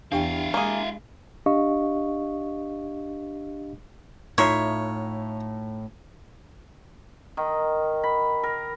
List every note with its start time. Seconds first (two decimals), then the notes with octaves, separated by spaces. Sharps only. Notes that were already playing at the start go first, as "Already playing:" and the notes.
0.12 E2 D4 E4 G4 F5 G5
0.54 G#3 A#3 G#4
1.46 D4 G4 D#5 F5 C#6
4.38 A2 D#4 F4 C#5 E5
7.37 D#3
8.03 B5
8.43 A#4